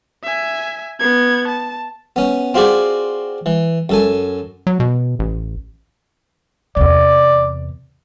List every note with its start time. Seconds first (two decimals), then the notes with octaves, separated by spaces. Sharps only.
0.24 E5 G#5
1.00 B3 G#6
1.48 A5
2.16 B3 C#4
2.54 C4 F4 F#4 G#4 D5
3.46 E3
3.89 F#2 A4 G#5
4.67 F#3
4.80 B2
5.19 A1
6.76 E2 C3 D5